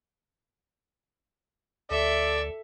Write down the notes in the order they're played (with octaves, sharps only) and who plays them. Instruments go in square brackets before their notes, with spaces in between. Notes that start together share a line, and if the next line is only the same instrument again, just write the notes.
[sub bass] D2 [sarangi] A4 [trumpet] D5 [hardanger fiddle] E5